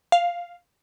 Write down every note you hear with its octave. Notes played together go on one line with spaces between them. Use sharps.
F5